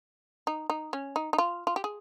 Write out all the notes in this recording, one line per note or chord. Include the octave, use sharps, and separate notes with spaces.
D#4
D#4
C#4
D#4
D#4
F4
F4
G4
G#4